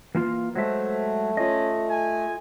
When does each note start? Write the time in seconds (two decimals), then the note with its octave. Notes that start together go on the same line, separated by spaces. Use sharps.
0.15 E3 A#3 F4
0.56 F#3 G#3 A3 C5 E5
1.37 C#4 F4 D#5
1.90 G#5